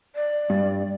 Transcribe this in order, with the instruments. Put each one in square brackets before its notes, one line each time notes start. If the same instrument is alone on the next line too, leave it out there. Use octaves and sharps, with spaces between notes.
[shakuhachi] D5
[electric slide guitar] G2